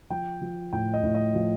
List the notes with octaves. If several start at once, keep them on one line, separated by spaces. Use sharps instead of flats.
F3 G5
F3
A2 G5
D#5
A2
D#5
F3